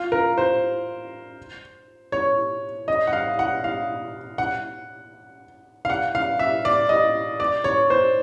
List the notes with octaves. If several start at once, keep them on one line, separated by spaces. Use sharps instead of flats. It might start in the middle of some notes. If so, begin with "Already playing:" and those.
Already playing: F4
A#4
C5
C#5
D#5
F#5
F5
F#5
F5
F#5
F5
F#5
F5
E5
D5
D#5
D5
C#5
C5